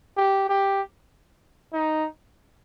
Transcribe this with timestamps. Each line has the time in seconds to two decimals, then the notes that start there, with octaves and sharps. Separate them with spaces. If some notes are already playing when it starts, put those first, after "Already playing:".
0.17 G4
0.49 G4
1.73 D#4